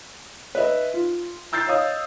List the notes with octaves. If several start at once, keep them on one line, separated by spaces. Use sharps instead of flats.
B4 D#5 E5
F4
A#5 E6 G6 A6 C7
C#5 D#5 F5 D#6